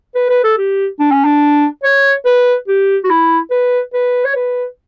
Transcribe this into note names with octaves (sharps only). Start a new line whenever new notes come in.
B4
B4
A4
G4
D4
C#4
D4
C#5
B4
G4
F#4
E4
B4
B4
C#5
B4